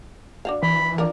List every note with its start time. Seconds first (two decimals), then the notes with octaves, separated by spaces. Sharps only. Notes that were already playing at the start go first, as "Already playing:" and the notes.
0.45 D4 F#4 F5
0.63 E3 B5
0.98 D4 F4 A#4